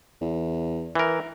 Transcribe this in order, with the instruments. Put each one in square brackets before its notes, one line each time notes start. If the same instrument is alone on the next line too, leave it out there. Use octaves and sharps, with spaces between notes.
[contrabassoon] E2
[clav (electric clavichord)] E3 A#4